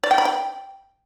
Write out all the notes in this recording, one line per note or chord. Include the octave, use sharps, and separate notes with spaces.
D5
G5
B5
G5